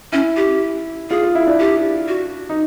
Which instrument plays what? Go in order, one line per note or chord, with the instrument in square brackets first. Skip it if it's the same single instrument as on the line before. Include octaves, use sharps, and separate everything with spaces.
[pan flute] C#4 [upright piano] E4
[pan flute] G4
[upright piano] F4 [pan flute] G#4
[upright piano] F4
E4
D4
[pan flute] G4
F#4
[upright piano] D#4